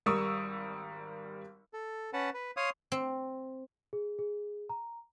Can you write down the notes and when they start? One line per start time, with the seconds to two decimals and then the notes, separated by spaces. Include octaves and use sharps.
0.06 G#1 G3 A#4 C#6 D#6 E6
1.74 A4
2.13 C#4 B4 F#5 A5
2.34 B4
2.57 C#5 F5 C6 D#6
2.92 C4
3.93 G#4
4.19 G#4
4.69 A#5